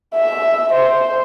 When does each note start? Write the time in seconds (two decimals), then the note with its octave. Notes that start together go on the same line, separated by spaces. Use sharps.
0.15 E5
0.73 C5